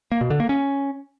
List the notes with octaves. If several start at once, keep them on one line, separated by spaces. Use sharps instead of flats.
A#3
B2
D3
A#3
C#4